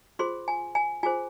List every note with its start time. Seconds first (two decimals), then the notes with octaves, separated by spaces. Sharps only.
0.19 F4 G#4 C5 C6
0.48 G#5
0.75 G#5
1.03 F4 G#4 C5 G#5